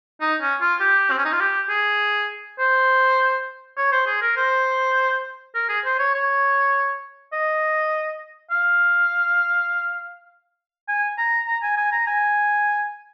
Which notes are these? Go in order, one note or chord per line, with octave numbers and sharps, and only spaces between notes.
D#4
C#4
F4
G4
C4
C#4
D#4
F4
G4
G#4
C5
C#5
C5
G#4
A#4
C5
A#4
G#4
C5
C#5
C#5
D#5
F5
G#5
A#5
A#5
G#5
G#5
A#5
G#5